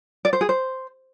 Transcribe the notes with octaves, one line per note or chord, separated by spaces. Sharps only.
D5
C5
G#4
C5